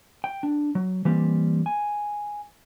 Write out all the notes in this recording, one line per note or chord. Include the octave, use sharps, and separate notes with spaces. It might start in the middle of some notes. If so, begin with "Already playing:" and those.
G5
D4
F#3
E3 G3 A#3 C4
G#5